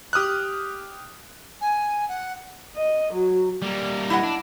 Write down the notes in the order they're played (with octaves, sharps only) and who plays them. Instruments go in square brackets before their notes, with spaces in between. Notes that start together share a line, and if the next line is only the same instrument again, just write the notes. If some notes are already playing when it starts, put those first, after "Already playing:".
[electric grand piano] G4 D#6 F6 F#6
[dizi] G#5
F#5
[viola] D#5
F#3
[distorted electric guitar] G3 A#3
[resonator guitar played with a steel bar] E4 D#5 F#5
[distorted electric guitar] D4